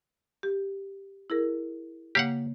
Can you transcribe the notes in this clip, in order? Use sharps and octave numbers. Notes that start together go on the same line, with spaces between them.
G4
E4 G#4 A#4
C#3 A#3 G4 F5 F#5